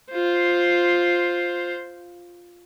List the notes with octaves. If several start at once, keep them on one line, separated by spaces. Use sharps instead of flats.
F4 C5